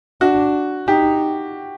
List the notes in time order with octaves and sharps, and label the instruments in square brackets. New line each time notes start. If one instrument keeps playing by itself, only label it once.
[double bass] D4 [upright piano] F#4
[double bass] D#4 [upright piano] G4